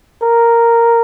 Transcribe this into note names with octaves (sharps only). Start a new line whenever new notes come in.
A#4